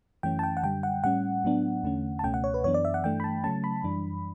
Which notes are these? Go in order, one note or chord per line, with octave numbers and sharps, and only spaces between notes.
F#2 E3 A3 C#4 G5
A5
G5
F#5
F#2 D3 G3 G5
F#5
A2 G3 C#4 F#5
A2 F#3 B3 D4
E2 D3 A3 C#4
A5
C#2 B2 A3 C#4 G5
F#5
C#5
B4
F#2 E3 B3 D4 C#5
D5
E5
F#5
G2 E3 A3 D4 G5
B5
A5
C#3 F#3 A3 C#4 A5
B5
F#2 E3 G3 D4